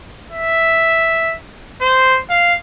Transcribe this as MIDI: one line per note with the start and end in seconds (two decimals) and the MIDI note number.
0.32 1.35 76
1.81 2.19 72
2.30 2.54 77